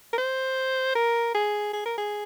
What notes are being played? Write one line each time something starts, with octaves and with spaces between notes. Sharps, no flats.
A#4
C5
A#4
G#4
G#4
A#4
G#4